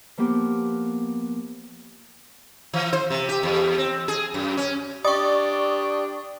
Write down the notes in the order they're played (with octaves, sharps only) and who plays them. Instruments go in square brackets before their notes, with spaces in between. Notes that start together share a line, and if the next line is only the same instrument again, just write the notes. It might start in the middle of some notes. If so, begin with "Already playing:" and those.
[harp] F3 A#3 B3 G4
[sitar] E3
C5
C3
G4
E2
C4
G#4
F#2
C#4
[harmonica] D4 G4 [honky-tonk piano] D5 [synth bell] C#6 D#6